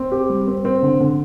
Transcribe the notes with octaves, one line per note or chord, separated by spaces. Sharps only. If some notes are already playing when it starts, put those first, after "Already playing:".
Already playing: C4
G4
G3
C4
C4
D3
D3